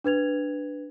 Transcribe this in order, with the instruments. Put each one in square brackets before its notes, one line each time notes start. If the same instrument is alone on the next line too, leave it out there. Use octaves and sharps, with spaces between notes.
[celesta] D4 B4 G#6 F7